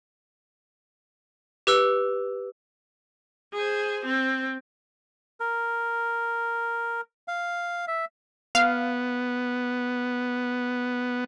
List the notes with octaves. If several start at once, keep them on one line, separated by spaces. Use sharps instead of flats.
G4 B4 E6
G#4 C5
C4
A#4
F5
E5
B3 F5